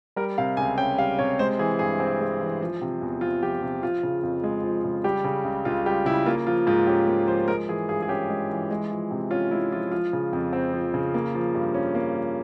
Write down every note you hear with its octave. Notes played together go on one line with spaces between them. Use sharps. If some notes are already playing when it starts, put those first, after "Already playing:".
G3 A#4
C3 F5
C#2 G#5
C#4 G5
G3 F5
C3 C#5
G#3 C5
E3 G#4
G2 G#4
C4
G#3
E3
F3
C3
E2
C4 F4
F3 G4
C3
F3 F4
C#3
F2
G#3
F3
C#3
G3 G4
C#3
C#2
C#2 F4
G3 G4
C#3 E4
A#3 F4
F3 F4
G#2 F4
C#4 G4
A#3
F3 C5
G#3 A#4
E3 G#4
G2 G#4
G#4
C#4 G4
G#3
E3
G#3
F3
C3
C#4 F4
G#3 E4
F3 F4
F3 F4
C#3
F2
C4
F3
C#3
A#3
F3
G2
C#4
A#3
F3